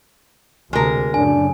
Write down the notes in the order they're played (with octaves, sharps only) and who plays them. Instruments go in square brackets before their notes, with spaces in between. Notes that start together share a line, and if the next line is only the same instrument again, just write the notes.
[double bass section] D2 C3 [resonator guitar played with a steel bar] G#3 A#4
[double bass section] F#2 A2 C#3 [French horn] D4 [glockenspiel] G#5